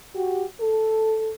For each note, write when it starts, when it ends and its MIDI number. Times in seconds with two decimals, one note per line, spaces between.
0.15 0.43 66
0.15 0.43 67
0.60 1.34 69